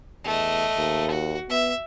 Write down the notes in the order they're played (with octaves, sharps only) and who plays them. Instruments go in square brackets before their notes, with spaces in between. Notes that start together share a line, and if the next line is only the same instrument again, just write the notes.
[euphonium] E2 [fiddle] A3 D#5
[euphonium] D#2
[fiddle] F#4
[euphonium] B3 [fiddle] E5